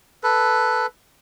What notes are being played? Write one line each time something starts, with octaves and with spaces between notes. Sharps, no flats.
A4 B4